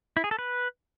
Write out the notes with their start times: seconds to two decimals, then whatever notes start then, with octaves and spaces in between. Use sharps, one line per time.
0.17 E4
0.24 G#4
0.31 A4
0.39 B4